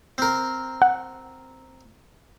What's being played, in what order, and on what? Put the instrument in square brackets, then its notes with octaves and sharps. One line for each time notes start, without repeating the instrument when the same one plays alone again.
[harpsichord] C4 A#4
[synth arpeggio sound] F#5